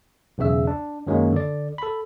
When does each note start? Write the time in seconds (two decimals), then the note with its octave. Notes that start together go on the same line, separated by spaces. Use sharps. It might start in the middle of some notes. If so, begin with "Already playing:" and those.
0.38 B1 E2 C#3 E5 E6
0.67 D4
1.07 F#2 D#3 F#3 G#3 A#3 C#4
1.32 D3 D5
1.78 A4 B5